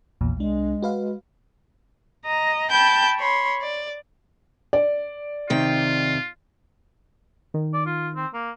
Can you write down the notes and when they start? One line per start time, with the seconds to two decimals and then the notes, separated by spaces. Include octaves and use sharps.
0.21 A#1 E2 A#2
0.37 C2 G#3 D4
0.83 F#4 B4 F5
2.25 D#5 A#5
2.70 G5 A5 B5 G6
3.17 C#5 B5 C6
3.61 D5
4.73 D5
5.50 C3 D#3 F4 G5
7.54 D#3
7.74 D5
7.86 F4
8.16 C4
8.34 A#3